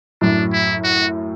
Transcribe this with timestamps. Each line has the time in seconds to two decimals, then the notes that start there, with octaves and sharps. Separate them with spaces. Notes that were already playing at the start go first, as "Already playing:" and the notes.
0.21 F#2 A2 D4
0.53 E4
0.84 F#4